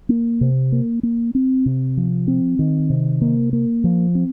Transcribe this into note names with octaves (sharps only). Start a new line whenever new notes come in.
A#3
C3
A#3
A#3
C4
C3
F3
C4
D#3
C3
A#3
A#3
F3
C4